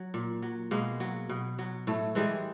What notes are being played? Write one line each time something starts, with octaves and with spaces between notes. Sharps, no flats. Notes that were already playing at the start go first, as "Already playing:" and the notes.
Already playing: F#3
A#2
F#3
B2 G#3 A#3
F#3
B2
F#3
A2 A3
E3 G3 G#3